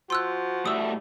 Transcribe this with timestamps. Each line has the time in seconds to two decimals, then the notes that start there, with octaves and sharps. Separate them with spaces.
0.10 F3 F#4 C6 E6 F#6
0.66 A2 G3 A3 D#6 E6